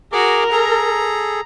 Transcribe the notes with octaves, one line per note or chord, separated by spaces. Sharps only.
F#4 G#4 A#4 D6
G#4 A4 A#5